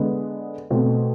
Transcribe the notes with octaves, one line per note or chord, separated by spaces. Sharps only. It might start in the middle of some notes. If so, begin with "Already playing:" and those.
Already playing: D3 G#3 B3
B2 A3 C4